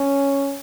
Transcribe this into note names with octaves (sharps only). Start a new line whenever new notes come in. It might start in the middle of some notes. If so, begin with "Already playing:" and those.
Already playing: C#4